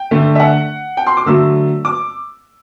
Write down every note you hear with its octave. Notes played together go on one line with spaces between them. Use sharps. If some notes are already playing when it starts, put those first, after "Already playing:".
Already playing: G5
D3 A3
E5
F#5
G5
C6
D6
D3 F#3 A3 E6
D6